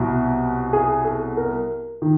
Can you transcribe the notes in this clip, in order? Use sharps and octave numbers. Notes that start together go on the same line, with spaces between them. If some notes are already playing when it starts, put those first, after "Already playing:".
Already playing: C2 B2 F#3
G#4
A4
A#4
D#3